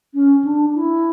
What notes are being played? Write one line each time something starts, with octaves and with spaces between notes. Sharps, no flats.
C#4
D4
E4